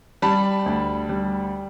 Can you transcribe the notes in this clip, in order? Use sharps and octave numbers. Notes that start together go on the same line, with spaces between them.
G3 A5 B5
D2
G3